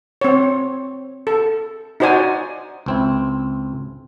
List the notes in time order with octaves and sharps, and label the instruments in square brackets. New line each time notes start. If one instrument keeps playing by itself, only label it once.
[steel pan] C4 C#5
A4
D#4 F#4 C5 D5 G#5
[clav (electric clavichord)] C#2 C4 E4